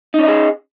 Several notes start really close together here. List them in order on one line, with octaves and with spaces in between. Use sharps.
D#4 C#4 D#5 G#4